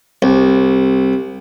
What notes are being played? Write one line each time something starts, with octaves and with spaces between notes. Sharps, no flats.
C2